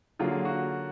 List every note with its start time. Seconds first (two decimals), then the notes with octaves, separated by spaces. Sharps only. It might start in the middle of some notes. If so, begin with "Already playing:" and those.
0.19 D3 F#3 A#3 F4 G#4
0.45 F#4